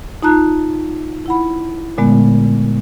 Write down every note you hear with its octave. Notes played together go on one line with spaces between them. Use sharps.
D#4 F4 A5 A#5 F#6
E4 F#5 B5
A#2 D3 G#3 A3 B3